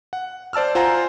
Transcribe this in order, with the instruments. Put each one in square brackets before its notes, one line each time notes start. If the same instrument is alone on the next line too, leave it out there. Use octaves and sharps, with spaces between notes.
[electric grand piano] F#5
C5 D5 A5 E6 F6
F4 C5 F#5 G#5 A#5